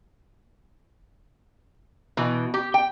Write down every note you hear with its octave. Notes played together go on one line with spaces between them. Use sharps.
B2 E3
G4
G5